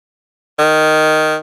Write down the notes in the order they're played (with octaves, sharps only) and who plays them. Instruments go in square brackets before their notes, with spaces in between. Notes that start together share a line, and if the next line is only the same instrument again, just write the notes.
[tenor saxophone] D#3